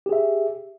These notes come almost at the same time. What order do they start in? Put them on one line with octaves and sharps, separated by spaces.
G4 G#4 E5